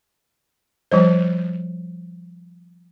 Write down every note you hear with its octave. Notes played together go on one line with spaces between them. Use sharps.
F3 G3 C5